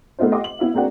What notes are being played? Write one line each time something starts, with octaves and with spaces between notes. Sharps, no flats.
A3 B3 D#4 F4 C5
G4 D#5 E5 F#5 C6 D6
F#7
B3 E4 E5 F5
G#3 A#3 C4 D4 F#4